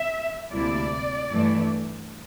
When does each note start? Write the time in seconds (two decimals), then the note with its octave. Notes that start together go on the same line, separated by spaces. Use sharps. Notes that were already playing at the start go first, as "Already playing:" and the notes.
Already playing: E5
0.51 D2 C3 G3 A#3 E4 D5
1.32 G2 E3 A3